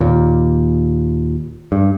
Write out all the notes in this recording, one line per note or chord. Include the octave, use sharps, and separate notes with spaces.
D#2 A#2
G2